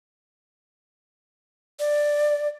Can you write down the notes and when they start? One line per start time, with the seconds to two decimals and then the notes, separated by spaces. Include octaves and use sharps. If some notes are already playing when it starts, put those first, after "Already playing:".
1.80 D5